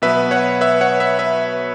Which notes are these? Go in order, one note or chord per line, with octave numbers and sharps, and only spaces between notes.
B2 F#3 B3 B4 E5
C#5 F#5
B4 E5
C#5 F#5
B4 E5
B4 E5